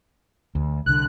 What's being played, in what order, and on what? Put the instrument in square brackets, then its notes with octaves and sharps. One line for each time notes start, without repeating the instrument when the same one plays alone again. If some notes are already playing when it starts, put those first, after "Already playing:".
[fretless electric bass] D2
[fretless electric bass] C2 D3 [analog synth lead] F#6